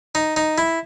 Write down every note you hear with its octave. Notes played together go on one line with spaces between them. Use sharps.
D#4
D#4
E4